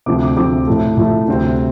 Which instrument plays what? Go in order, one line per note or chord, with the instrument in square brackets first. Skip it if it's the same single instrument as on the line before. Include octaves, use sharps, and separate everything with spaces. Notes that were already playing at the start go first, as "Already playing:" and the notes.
[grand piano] D2 C3 F3 C4 D6
D6
D2 C3 F3 C4 D6
A2 F3 A3
A2 F3 A3
D2 C3 G3 C4